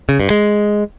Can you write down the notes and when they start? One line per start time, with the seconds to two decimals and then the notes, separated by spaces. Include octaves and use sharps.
0.09 C#3
0.20 G2
0.30 G#3